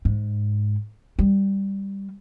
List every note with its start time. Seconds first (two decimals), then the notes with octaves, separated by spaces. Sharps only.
0.05 G#2
1.19 G3